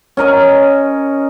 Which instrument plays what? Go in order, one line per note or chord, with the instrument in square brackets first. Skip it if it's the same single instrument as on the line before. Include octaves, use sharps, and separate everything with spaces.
[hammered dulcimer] C#4 A#4 D#5